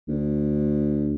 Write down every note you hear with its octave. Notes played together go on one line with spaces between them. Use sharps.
D2